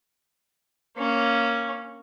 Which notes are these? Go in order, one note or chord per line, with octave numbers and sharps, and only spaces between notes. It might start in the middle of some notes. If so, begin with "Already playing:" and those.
A#3 C#4